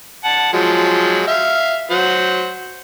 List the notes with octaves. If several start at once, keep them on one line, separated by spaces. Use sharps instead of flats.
F#5 A5
F3 F#3 G#3
E5 F5
F#3 C5 F#5